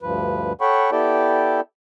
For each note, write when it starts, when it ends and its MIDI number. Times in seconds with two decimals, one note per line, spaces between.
0.02 0.53 38
0.02 0.53 43
0.02 0.53 53
0.02 0.53 71
0.61 0.90 69
0.61 0.90 73
0.61 0.90 78
0.61 0.90 79
0.61 0.90 83
0.61 0.90 85
0.92 1.61 59
0.92 1.61 64
0.92 1.61 67
0.92 1.61 69
0.92 1.61 74
0.92 1.61 79